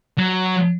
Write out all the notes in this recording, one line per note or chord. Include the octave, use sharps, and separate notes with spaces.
F#3